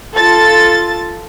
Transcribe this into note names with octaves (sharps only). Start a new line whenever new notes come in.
F4 A4 A6